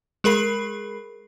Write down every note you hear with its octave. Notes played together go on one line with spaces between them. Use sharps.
G#3 G#4 A#4 B5 C7